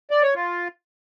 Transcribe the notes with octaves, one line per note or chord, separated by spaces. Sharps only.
D5
C#5
F4